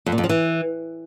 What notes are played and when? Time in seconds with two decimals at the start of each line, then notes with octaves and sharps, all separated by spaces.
0.06 F2
0.12 A#2
0.18 F2
0.24 F3
0.29 E3